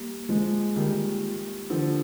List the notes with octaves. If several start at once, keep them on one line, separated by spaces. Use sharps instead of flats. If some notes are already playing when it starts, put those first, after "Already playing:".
Already playing: G3 A#3
F3 G#3
D#3 G3
D3 F3